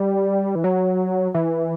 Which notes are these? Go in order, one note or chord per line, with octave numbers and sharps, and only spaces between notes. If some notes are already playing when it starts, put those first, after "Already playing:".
Already playing: G3
E3
F#3
E3